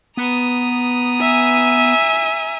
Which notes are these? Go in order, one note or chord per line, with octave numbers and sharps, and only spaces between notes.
B3 A#5 D#6
E5 G#5